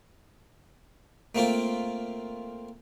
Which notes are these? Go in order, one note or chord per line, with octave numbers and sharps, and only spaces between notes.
A3 A#3 C4 F4